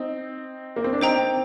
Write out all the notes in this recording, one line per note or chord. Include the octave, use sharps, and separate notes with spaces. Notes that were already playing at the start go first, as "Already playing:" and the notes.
Already playing: C4 D#4
A#3
C4
D4
C4 D#4 C5 G5 A#5